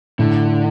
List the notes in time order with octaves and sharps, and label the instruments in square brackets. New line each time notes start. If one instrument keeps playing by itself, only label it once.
[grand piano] A2 [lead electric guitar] D3